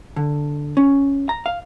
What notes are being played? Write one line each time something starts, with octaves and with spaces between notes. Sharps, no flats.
D3
C#4
A#5
F5